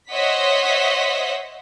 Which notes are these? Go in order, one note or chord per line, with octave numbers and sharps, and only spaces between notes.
C5 C#5 D#5 E5 F#5 B6